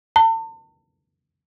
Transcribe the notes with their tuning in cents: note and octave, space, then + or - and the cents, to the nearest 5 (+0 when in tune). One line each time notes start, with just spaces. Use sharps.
A5 +40